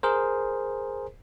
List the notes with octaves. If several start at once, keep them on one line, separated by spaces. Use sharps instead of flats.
G#4 A#4 C5